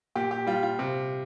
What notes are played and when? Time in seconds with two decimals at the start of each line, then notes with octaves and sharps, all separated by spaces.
0.15 A#2 G4
0.31 G4
0.47 G3 F4
0.63 F4
0.79 C3